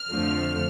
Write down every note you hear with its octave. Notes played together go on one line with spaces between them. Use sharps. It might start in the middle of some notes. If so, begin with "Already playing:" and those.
Already playing: F6
F2 D3 F3 A3